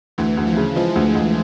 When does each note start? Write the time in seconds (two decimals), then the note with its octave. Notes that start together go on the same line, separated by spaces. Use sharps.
0.18 D2 E3
0.37 D2
0.47 F3
0.57 C#3
0.76 F3 G#3
0.95 D2
1.15 D2